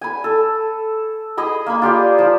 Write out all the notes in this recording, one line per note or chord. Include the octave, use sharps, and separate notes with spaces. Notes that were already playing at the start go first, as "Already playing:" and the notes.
G#5 B5
A4
G#4 D#5 B5
A#3 G#5 B5
F4 G4 G#4 D5
F3